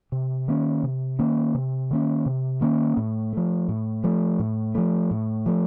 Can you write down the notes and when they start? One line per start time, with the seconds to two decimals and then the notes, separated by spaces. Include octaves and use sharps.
0.12 C3
0.48 D#3 A#3 C#4
0.83 C3
1.19 D#3 A#3 C#4
1.55 C3
1.91 D#3 A#3 C#4
2.26 C3
2.61 D#3 A#3 C#4
2.97 A2
3.33 F3 A3
3.68 A2
4.04 F3 A3
4.39 A2
4.75 F3 A3
5.11 A2
5.46 F3 A3